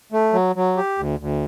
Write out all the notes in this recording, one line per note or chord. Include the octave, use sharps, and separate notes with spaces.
A3
F#3
F#3
G4
D2
D2